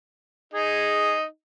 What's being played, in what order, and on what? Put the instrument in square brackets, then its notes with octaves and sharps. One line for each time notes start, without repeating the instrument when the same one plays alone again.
[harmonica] D#4 [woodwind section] G#4